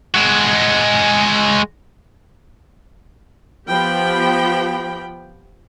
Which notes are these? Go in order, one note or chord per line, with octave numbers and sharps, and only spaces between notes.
G#3 F#4
F3 B3 G4 G5 B5